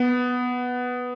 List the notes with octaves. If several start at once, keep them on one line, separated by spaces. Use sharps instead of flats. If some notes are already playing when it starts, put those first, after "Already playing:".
Already playing: B3